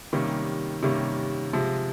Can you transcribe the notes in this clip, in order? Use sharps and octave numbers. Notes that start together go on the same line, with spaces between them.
C3 D#3 G3 A#3 C#4
C3 D#3 G3 A#3 C#4
C3 F3 G#3